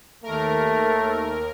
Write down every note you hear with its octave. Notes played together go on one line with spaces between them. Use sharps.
D#2 A3 A#4